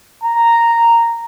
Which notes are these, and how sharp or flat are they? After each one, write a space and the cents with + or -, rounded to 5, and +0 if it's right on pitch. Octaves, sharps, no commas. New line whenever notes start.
A#5 -5